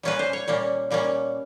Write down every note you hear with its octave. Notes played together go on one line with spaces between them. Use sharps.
A#2 G3 A#3 C#4 B4
C5
C#5
A#2 G3 A#3 C#4
A#2 G3 A#3 C#4